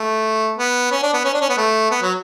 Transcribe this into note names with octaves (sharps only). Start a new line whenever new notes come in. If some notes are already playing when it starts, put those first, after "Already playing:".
Already playing: A3
B3
C#4
D4
B3
C#4
D4
C#4
B3
A3
B3
F#3